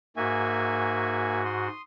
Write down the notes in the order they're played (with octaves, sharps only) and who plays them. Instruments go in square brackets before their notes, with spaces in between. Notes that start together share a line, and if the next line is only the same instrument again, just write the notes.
[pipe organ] G#2 F#4 [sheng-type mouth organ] A#3 E5 G#5
[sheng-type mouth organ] C6 D#6